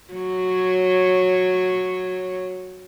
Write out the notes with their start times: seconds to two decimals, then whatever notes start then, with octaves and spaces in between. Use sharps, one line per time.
0.13 F#3 C#5